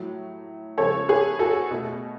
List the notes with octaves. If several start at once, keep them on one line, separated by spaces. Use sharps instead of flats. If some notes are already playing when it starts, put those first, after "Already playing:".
Already playing: A2 F#3 A3
C#3 F3 G#3 A4 C#5
G#4 B4
F#4 A4
B2 A3